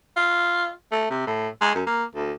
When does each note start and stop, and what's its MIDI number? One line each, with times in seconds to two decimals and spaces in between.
0.16 0.69 65
0.91 1.06 57
1.10 1.27 48
1.27 1.48 45
1.61 1.72 56
1.75 1.84 42
1.86 2.04 58
2.15 2.32 38